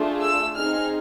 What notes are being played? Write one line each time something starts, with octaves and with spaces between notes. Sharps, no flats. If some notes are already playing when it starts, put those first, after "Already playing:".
Already playing: A3 D4 F4 G#4
E6
C4 D#4 G#4 F6